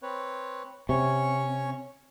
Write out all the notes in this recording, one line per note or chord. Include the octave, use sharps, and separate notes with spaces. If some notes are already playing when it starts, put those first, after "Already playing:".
C4 B4 C#5
C3 C#4 C#5 C#6